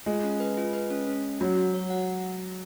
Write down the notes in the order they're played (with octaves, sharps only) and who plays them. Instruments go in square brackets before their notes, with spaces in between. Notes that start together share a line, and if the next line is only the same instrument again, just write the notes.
[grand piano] G#3 [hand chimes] F4
[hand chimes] C#4
B4
F4
B4
C#4
C#4
C#4
[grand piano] F#3 [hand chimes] F#4
[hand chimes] F#4
C#5
F#5